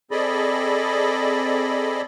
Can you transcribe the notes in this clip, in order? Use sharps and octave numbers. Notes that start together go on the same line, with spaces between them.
C4 G#4 A4 D5 D#5 B5